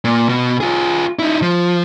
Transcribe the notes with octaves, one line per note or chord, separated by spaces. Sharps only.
A#2
B2
F4 G#4
D#4 E4
F3